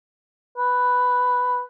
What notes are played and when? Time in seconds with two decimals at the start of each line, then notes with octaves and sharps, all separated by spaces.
0.57 B4